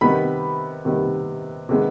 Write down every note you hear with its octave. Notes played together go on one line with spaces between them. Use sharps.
C3 D#3 G3 B3 B5
C3 D#3 G3 B3
C3 D#3 G#3 B3